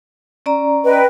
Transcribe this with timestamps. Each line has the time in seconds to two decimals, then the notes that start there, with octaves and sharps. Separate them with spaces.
0.46 C#4 D5 A#5
0.84 B4 D#5 G5